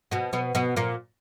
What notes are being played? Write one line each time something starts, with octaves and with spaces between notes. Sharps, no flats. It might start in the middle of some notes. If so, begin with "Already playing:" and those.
B2 B3
B2 B3
B2 B3
A#2 A#3